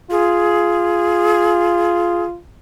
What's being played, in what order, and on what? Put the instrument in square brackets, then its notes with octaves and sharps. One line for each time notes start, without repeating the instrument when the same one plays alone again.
[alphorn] F4 [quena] G#4